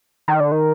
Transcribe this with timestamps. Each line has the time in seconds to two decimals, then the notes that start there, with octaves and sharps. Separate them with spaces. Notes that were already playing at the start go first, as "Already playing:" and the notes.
0.28 D#3
0.40 D3
0.52 D#3